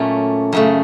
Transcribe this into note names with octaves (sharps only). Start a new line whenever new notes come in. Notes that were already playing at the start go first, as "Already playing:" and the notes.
Already playing: A#2 F#3 A3 C#4
F#2 C#3 A3